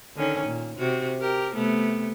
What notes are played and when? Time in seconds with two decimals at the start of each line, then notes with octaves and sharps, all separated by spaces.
0.16 D3 D#3 C#4
0.46 A#2
0.78 C3 F#4
1.20 G4 A#4
1.55 C3 A3 B3